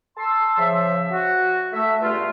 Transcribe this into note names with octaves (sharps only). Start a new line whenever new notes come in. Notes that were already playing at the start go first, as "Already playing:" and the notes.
A5 C6 E6
C#3 F3 E5
F#4
A3 E5
E2 G2 A3 F4